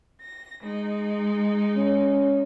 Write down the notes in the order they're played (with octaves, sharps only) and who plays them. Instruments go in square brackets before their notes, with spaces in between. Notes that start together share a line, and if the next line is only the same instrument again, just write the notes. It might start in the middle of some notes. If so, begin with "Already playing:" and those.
[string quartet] A#6
G#3 D#4
[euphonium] C#4